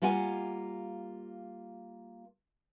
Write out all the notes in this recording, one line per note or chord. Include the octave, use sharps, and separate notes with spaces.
G3 A#3 F4 F#5 G#5